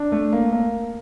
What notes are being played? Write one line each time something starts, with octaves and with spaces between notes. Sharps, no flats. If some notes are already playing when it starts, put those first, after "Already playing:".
Already playing: D4
A3
A#3
A#3